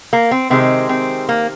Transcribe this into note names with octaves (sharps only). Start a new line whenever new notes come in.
A#3
C4
C3 D#3 G#3 C4
C4
A#3